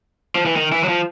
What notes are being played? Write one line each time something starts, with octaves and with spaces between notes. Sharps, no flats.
F3
E3
D#3
E3
F#3
F3